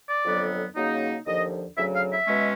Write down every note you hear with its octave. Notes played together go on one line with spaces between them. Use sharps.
D5
F2 D3 F#3 B3
C#3 F#3 A#3 D#4
D#2 D3 F3 D#5
D2 C#3 F#3 E5
F5
E5
B2 G#3 C#4